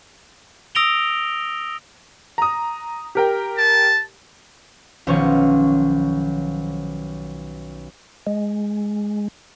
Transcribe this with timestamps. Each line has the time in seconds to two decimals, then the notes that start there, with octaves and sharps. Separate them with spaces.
0.75 D#6 E6 A#6 D7 F7 G7
2.38 A#5 D#6
3.15 G4 A#4 G5
3.58 A5
5.07 B1 D#3 F3 C#4 C#6
8.27 G#3